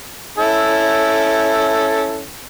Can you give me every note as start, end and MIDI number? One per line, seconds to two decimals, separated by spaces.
0.38 2.27 61
0.38 2.27 64
0.38 2.27 69